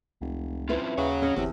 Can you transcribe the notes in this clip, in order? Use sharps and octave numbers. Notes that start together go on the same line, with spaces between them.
F1 C#2
C4 C#4 E4 F4 B4 C5
D#2 C#3 C#5 F#5
C#4 D#5
G1 E2 C3